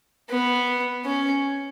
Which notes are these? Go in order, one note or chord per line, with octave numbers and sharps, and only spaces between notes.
B3
C#4